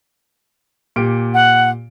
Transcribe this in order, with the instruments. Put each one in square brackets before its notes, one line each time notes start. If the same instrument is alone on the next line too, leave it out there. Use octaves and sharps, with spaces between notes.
[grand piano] A#2 G4 D7
[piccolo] F#5